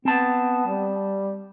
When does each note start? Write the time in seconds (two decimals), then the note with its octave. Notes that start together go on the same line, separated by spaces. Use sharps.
0.05 B3 C4 A5
0.67 G3